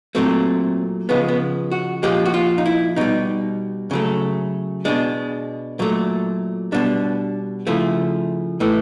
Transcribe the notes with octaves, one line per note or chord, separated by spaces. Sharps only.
A#2 F#3 A3 C4
C#3 F3 G#3 B3
B3
F#4
A#2 F3 G#3 G4
F#4
F4
D#4
E4
B2 G3 D#4
C#3 F#3 A3
B2 G#3 D4
A#2 F#3 A3
B2 G3 D4
C#3 F3 A3 E4
A2 E3 A3